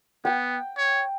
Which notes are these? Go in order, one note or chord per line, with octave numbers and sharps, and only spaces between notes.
B3 G5
C#5